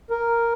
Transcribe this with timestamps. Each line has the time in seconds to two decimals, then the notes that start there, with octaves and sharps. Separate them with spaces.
0.10 A#4